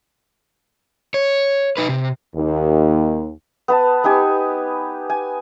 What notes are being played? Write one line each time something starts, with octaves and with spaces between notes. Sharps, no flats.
C#5
D#4 B4
C3
D#2
B3 B4 A5
B3 D#4 G4 G#5
G#5